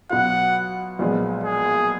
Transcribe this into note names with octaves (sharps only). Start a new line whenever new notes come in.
B2 F#3 B3 F4 F#5
B1 A#2 F3 G#3 B3
G#4